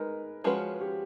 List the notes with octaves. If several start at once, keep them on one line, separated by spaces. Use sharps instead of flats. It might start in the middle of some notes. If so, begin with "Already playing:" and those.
Already playing: G#3 D#4 A#4 B4
F3 G#3 C#4 F#4 B4
G4